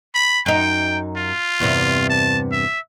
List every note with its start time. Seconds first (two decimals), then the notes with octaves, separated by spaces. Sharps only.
0.15 B5
0.46 F#2 D#4 G5
1.17 F4
1.60 E2 G2 C3
2.10 A5
2.52 E5